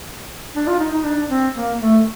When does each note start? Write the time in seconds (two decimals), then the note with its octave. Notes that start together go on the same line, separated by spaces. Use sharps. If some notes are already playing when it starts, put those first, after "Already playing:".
0.55 D4
0.67 F4
0.79 D#4
0.93 D#4
1.04 D4
1.29 C4
1.55 A#3
1.80 A3